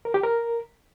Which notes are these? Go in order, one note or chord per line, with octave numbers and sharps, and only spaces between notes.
A#4
G4
A#4